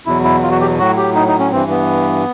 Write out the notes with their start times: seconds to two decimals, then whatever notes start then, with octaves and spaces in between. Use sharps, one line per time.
0.06 E2 B2 F#3 E4
0.24 E4
0.42 F4
0.51 F#4
0.60 G4
0.79 A2 F#3 F#4
0.97 G4
1.15 D#4
1.27 D#4
1.40 C#4
1.51 G2 E3 C4
1.70 B3